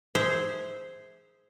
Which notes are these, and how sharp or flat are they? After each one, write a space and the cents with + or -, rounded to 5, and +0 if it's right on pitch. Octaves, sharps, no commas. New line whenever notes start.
G#4 +0 C5 -5 E5 -20